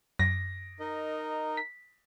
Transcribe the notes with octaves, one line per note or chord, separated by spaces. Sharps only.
F#2 A#6
D#4 A#4 D#5
B6